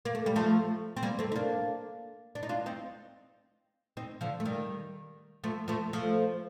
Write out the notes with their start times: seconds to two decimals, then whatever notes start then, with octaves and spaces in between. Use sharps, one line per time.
0.05 A#3
0.15 A3
0.26 G3
0.36 F3 A3
0.96 C4
1.03 G3 A#3
1.19 A3 C4
1.32 D#4
1.36 A#3 D4
2.35 D4
2.43 D#4
2.49 D4 F4
2.66 C4 D#4
3.97 C4 D#4
4.21 D3 F3
4.40 A3
4.45 D#3 G3
5.44 F3 A3
5.68 F3 A3
5.93 F3 A3